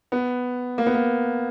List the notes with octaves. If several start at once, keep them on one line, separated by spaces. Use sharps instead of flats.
B3
A#3
B3
A#3